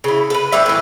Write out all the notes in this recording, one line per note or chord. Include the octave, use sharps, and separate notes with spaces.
C#3 E4
A4 B4
A2 G3 D4 E5
A2 E3